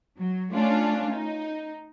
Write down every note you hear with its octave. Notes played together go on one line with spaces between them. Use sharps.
F#3
A3 C#4 D4 F4
D#4